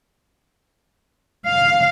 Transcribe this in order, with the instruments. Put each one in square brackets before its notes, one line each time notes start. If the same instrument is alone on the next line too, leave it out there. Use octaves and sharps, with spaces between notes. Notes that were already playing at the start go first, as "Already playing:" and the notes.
[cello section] F5